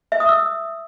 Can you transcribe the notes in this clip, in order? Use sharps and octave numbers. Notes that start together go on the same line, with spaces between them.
E5
D#6
E6